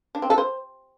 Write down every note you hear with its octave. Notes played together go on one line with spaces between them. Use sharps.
D4
C4
A4
C5